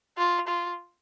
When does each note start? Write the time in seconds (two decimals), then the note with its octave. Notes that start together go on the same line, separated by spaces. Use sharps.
0.18 F4
0.48 F4